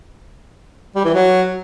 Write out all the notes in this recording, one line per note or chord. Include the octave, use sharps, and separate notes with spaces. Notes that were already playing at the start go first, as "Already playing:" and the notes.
G3
E3
F#3